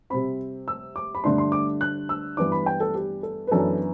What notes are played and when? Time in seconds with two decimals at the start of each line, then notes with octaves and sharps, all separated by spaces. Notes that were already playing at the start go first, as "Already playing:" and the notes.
0.10 C3 G3 C4 B5
0.68 E6
0.96 D6
1.15 B5
1.24 G2 D3 A3 D4 C6
1.38 C6
1.52 D6
1.81 F#6
2.09 E6
2.37 G2 E3 B3 D4 D6
2.52 B5
2.66 G5
2.80 A4
2.95 G4
3.23 A4
3.47 B4
3.51 F#2 E3 B3 D4 A4